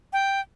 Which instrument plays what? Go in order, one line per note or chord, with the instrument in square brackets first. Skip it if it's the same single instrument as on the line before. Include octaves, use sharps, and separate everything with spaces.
[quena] G5